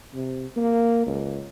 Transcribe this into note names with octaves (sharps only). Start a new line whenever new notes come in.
C3
A#3
C#2